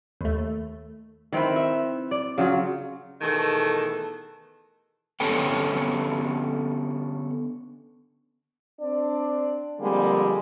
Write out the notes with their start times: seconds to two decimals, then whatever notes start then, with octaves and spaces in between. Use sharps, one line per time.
0.21 D#2 A3
1.32 D#3 C4 E4 B4
1.56 E5
2.11 D5
2.38 C#3 F#3 F4
3.21 B2 D#3 E3 A3 G#4 A4
5.20 D3 B3 C#4 A4 B4 G5
8.80 C4 D4 D5
9.80 F2 D3 G3 G#3 A#3